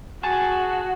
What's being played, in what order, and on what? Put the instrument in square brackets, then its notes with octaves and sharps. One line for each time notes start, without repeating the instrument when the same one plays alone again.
[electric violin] F#4 [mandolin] G#4 A5 C#6